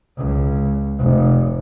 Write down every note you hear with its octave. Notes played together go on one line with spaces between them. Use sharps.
C#2
F1